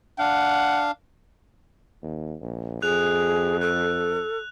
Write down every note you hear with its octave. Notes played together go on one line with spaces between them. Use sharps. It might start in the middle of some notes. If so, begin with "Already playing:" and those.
D4 F5 F#5
D#2
A#1
F2 G#4 F#6 F7
A4 F#6